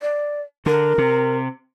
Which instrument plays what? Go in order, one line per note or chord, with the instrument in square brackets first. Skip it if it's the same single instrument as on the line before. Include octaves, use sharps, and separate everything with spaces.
[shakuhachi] D5
[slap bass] D3 [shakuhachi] A#4
[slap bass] C3